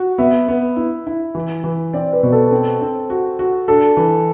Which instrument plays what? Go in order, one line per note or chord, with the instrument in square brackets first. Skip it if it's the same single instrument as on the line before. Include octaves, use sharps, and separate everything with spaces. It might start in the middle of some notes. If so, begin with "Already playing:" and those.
Already playing: [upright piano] F#4
[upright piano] B3 [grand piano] E5
[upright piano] B3
E4
E4
E3
E3
[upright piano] C4 [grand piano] D5
[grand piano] B4
[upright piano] B2
[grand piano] A4
[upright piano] C4
C4
F#4
F#4
[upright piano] D4 [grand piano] A4
[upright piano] E3